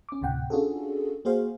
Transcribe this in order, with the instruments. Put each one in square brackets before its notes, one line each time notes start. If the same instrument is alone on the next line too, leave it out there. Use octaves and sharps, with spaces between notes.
[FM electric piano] C#4 D6
D2 A2 C3 F#5 G5
C#4 D4 F4 F#4 G#4 A4
A#3 F#4 G#4 C5 F5